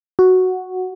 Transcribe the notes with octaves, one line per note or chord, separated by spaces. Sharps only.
F#4